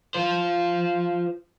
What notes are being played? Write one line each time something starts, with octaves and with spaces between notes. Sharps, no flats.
F4 C5